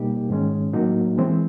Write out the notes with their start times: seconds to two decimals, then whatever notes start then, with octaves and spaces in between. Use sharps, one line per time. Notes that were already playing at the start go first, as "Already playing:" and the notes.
Already playing: B2 G3 A#3 D#4 G4
0.30 G#2 D#3 G#3 C#4
0.74 A2 F#3 A#3 D#4 F#4
1.18 E3 G#3 C4